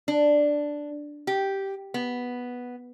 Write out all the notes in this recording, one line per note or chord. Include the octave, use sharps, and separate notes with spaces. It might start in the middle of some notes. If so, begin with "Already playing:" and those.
D4
G4
B3